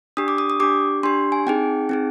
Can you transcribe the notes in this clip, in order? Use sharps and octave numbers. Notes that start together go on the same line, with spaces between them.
D4 G4 D#6
D6
D#6
D#6
D4 G4 D6
D4 G4 C6
G#5
C4 D#4 G#4 G5
C4 D#4 G#4